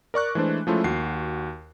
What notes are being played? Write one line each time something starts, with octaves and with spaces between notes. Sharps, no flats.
A#4 D5 C#6 F#6
E3 G#3 A3 D4 C5
F3 G#3 A3 C#4 E4 F4
D#2 F#4 C7